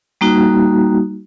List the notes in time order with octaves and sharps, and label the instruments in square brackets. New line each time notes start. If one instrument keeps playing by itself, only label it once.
[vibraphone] G3 A#3 D#4 F#4